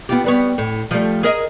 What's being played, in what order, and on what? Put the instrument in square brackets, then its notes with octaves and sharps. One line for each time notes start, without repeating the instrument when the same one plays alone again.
[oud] B3 F4 G4
G3 B3 C#5
A2
F3 G3 A3
G#4 A#4 D#5